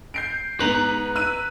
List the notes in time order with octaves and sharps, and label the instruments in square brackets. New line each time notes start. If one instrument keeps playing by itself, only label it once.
[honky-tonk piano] G6 C7 D7
[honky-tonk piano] G#2 B3 F#7 [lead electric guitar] B4 A#5
[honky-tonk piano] E6 F#6 D#7